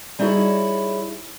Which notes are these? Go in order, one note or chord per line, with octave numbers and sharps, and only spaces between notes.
G3 D#4 E4 F#4 G#4 C#5